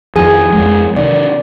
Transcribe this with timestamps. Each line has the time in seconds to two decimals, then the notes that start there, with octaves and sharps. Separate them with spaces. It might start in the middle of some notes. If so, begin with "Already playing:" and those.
0.16 F2 D#3 F3 G#4 G#5
0.53 F2 G#3
0.96 C3 D#3 D5